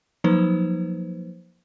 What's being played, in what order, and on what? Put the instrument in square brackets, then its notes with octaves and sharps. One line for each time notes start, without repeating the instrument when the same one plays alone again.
[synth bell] F3 F#3 A#3 D#4 B4 C5